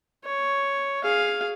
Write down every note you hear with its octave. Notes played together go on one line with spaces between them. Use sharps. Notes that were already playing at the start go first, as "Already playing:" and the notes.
C#5
G#4 F5